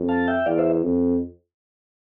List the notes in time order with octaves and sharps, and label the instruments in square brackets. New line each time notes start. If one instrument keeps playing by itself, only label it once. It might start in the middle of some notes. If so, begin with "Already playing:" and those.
Already playing: [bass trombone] F2
[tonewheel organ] F5 A5
E5 G5
[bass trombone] E2 [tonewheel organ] D5 F5
[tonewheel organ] C5 E5
[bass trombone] F2